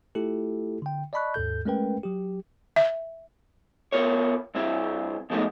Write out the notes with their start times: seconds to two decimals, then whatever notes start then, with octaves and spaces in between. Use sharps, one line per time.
0.15 A3 E4 F4 G4 A4
0.82 D3 G5
1.13 D5 D#5 A5 B5 C#6 F#6
1.34 D#2 G#2 A4 G6
1.65 G#3 A3 C#4 A#4 B4 G5
2.03 F#3 G4
2.76 E5
3.92 B3 F4 A#4 C#5
4.55 G2 C4 E4
5.30 B2 F3 G#3 A3 B3 D#4